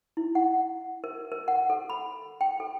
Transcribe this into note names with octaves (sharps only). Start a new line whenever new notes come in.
E4
F#5
A#4
A#4
F#5
A4
B5
G5
A4